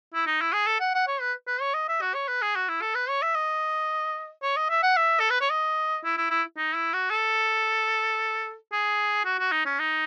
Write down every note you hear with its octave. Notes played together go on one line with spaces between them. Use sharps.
E4
D#4
E4
G#4
A4
F#5
F#5
C#5
B4
B4
C#5
D#5
E5
F#4
C#5
B4
G#4
F#4
E4
A4
B4
C#5
E5
D#5
C#5
D#5
E5
F#5
E5
A4
B4
C#5
D#5
E4
E4
E4
D#4
E4
F#4
A4
G#4
F#4
F#4
D#4
C#4
D#4